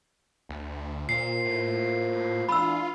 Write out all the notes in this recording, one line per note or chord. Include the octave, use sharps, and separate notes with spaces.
D2
A#2 A#3 F4 C5 C7
A2
E3 B3 D4 F4 B5 E6